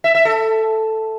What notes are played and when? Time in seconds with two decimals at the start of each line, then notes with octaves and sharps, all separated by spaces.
0.04 E5
0.15 E5
0.25 A4